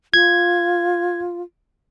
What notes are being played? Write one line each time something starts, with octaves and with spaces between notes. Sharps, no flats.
F4 G#6